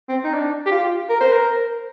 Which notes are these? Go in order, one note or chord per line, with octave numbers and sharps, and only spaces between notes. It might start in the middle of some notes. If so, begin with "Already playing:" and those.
C4
D#4
D4
G4
F4
A#4
C5
A#4